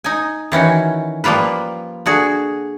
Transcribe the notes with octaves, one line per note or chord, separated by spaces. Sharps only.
D#4 G#5
D#3 E3 C#4 F#4
F3 G3 A#3 F4 B4
D3 F#4 G#4